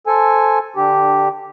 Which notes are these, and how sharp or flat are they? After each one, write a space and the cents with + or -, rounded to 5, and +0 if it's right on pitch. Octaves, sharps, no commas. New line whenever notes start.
A4 +0 C5 +0 G#5 +0
D3 +15 D4 +0 G4 -5